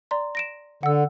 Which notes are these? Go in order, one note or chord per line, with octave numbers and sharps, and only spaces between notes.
D5 A#5 C6
A#6 D7 E7
D3 F#5 E6